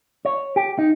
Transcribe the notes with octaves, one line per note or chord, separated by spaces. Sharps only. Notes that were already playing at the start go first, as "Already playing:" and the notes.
C#5
G4
D#4